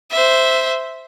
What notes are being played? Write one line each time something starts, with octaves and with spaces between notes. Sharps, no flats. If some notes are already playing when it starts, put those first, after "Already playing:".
C5 E5